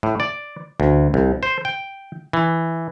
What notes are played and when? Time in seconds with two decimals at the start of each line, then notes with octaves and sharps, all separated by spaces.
0.03 A2
0.20 D5
0.80 D2
1.14 C2
1.43 C5
1.65 G5
2.33 E3